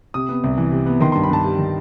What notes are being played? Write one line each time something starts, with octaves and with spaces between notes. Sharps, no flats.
C3 D#6
B3
C2
E3
C3
B3
D#3 C6
G2 C6
B5
G2 A5
G3
D#3